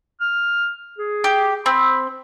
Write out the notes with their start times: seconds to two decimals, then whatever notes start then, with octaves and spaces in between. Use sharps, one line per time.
0.21 F6
0.98 G#4
1.24 G4
1.66 C4 B5